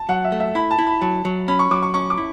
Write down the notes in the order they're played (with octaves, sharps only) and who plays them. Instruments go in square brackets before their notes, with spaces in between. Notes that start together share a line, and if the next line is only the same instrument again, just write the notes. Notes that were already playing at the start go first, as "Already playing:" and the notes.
Already playing: [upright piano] A5
[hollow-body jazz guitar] F#3 [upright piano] F#5
[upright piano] E5
[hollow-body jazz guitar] A3
[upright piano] E5
[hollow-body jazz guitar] E4 [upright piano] B5
[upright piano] A5
[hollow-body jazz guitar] E4
[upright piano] B5
[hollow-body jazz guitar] F#3 [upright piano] A5
[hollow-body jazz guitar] F#3
[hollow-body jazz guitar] C#4 [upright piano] B5
[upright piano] C#6
[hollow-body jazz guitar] F#3 [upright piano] D6
[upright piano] C#6
[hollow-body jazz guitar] C#4 [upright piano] C#6
[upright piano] D6
[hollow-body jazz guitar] E4